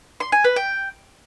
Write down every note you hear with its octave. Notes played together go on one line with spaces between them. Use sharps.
C6
G#5
B4
G5